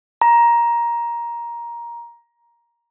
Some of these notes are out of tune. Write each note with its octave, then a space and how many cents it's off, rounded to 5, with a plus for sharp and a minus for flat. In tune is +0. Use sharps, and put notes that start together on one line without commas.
A#5 +15